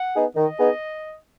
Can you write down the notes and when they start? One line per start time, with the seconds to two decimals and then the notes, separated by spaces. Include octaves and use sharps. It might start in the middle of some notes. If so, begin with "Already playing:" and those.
Already playing: F#5
0.14 B3 D#4 G#4
0.36 D#3 D#5
0.58 B3 D#4 G#4